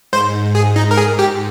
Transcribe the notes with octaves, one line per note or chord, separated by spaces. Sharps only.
G#2 C5
G#4
G#2 D#4
A#4
G#4
G#2
G4